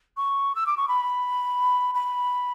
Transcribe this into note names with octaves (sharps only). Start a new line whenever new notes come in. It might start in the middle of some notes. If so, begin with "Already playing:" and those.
C#6
E6
D6
C#6
B5
B5